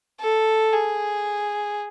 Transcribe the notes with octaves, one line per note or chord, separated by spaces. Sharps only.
A4
G#4